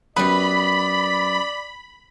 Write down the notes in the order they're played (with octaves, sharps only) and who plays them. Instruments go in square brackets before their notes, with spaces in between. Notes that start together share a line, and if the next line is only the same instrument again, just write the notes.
[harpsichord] F#2 B3 [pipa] G3 B4 [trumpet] D5 [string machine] B5